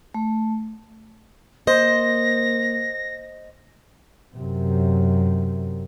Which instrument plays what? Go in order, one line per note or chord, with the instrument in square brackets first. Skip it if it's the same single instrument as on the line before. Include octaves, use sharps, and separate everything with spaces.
[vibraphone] A3
[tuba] A#3 [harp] C5 [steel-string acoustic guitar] D#5 [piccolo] A#6
[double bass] F#2 C3